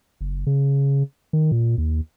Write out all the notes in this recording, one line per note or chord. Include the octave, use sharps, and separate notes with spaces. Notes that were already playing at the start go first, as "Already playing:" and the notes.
F#1
C#3
D#3
A#2
D#2